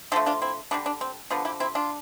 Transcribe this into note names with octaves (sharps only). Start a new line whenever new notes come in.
D3 F3 A3 A4 C5
D4 F4
C4 E4
D3 G3 B3 D4
D4
C4
D3 F3 B3
E4 G4
C4 E4
D4 F4